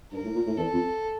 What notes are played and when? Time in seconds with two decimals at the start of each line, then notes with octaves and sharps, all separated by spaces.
0.12 G2 A#4
0.24 A2
0.35 A#2
0.46 A2
0.57 E2 A4
0.72 F2